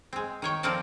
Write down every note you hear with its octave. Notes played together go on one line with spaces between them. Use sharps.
G#3 C4
D#3 C#5 G5
F3 C4 A4 A#4 D5 A5